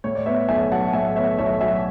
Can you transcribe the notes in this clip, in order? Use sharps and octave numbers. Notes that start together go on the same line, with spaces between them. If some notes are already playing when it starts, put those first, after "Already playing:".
A2 C#5
D5
B3 C#5 E5
B1 E5 G#5
F#3 F#5 A5
A2 E5 G#5
B3 C#5 E5
B1 C#5 E5
F#3 E5 G#5